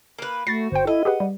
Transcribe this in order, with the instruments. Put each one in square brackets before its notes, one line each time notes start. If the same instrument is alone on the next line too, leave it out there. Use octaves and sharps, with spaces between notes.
[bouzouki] A#3 B4
[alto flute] A3 [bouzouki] F#4 [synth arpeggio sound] A6 A#6 C7
[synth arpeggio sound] G1 G5 [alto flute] C5
[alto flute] E4 [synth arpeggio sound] A4 [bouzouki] D#5
[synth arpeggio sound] G4 G#4 B4 [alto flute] F#5
[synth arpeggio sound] G3